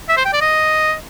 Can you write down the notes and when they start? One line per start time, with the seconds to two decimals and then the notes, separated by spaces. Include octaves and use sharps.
0.09 E5
0.17 C5
0.25 G5
0.33 D5
0.41 D#5